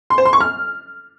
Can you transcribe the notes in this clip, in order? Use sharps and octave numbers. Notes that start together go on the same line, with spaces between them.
C6
C5
C6
C#6
F6